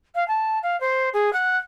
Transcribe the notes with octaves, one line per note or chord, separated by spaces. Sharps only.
F5
A5
F5
C5
G#4
F#5